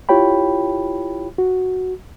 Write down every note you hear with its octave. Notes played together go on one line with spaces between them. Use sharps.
E4 F4 G4 C#5 G5 B5
F#4